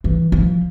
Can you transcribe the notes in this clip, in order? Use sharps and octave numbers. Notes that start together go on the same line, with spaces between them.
E3
F3